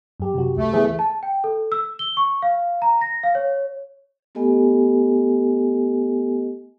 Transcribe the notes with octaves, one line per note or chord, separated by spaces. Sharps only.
F#2 G4
C3 F#4
C#2 A3
E3 B3 G#4
A5
G5
A4
E6
G7
C#6
F5
A#5
A#6
F5
C#5
A3 B3 G4 A4 D#5 G#5